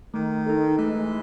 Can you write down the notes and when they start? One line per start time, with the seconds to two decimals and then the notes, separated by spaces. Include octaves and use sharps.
0.14 D#3 A3
0.46 D#4 A4
0.78 E3 G#3 A3